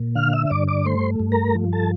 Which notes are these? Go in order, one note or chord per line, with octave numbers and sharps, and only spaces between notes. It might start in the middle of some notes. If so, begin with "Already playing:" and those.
Already playing: A#2
D3 F5 F6
E5 E6
E6
G2 D5 D6
D5 D6
A3 C5 C6
G2
A#4 A#5
F3
A4 A5